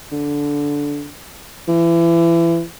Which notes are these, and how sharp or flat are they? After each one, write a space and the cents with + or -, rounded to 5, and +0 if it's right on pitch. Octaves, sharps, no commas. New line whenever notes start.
D3 -15
E3 +30